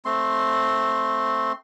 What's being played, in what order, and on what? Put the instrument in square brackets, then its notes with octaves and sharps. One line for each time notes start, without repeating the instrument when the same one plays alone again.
[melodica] A3 C4 C6